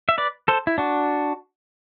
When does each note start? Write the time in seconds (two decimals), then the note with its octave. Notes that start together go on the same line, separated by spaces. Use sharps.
0.09 E5
0.18 B4 D5
0.48 A4 C5
0.67 E4
0.78 D4 F#4